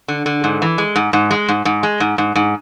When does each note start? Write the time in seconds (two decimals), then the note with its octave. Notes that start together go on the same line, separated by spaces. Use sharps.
0.08 D3
0.26 D3
0.44 G#2
0.62 E3
0.78 G#3
0.96 G#2
1.13 G#2
1.31 G#3
1.48 G#2
1.65 G#2
1.83 G#3
2.00 G#2
2.18 G#2
2.35 G#2